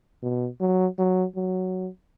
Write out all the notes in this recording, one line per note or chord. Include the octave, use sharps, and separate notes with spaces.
B2
F#3
F#3
F#3